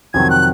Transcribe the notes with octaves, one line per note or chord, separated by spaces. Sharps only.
F2 C3 D#3 F#3 G#6
F#6